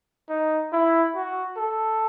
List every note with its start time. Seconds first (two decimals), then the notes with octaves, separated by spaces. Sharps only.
0.29 D#4
0.72 E4
1.15 F#4
1.58 A4